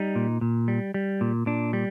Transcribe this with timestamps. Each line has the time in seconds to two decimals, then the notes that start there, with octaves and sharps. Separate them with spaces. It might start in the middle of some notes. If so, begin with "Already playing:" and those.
Already playing: G3 D#4
0.16 A#2
0.41 A#2
0.68 G3
0.94 G3
1.21 A#2
1.46 A#2 D4
1.73 G3